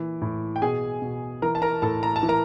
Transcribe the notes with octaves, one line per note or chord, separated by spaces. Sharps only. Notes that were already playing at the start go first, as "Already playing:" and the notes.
Already playing: A#2 E3
A2
G5
B2 G#4 G#5
B2
E3 A#4 A#5
A5
A#4 A#5
A2 A4 A5
A#5
A5
E3
A#4 A#5